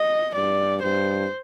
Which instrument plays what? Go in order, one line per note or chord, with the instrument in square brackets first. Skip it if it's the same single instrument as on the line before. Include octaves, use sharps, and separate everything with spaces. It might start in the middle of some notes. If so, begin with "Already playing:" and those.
Already playing: [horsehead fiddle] D#5
[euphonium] G2 [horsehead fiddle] D5
[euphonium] G2 [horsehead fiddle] C5